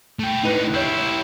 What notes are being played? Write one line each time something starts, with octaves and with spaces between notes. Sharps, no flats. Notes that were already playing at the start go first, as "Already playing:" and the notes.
A3 G5
A2 D3 D#4 B4 F#6
E4 G4 C#5 G6 C7